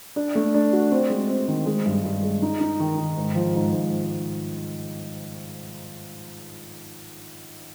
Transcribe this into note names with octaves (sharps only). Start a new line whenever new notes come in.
D4
A3
D4
F#4
C4
G#3
C4
D#3
G#3
G2
G2
G#3
D#4
D#4
D#3
D#3
G#2
F3
G#2
G#2